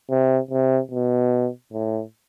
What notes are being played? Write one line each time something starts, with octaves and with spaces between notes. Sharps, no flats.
C3
C3
B2
A2